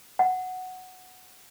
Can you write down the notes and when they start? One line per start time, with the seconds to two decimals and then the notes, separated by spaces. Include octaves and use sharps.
0.19 F#5